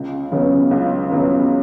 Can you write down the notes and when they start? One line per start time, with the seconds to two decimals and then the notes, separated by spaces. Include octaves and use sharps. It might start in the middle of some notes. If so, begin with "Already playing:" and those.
Already playing: C#2
0.32 C#3 F#3 B3
0.71 C#2
1.10 C#3 F#3 B3